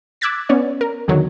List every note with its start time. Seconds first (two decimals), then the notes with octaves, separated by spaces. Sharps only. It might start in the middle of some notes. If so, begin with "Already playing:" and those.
0.21 D6 E6 F#6 G#6 A6 B6
0.49 B3 C#4 C#5 D5
0.81 A#4
1.08 E2 D3 D#3 F#3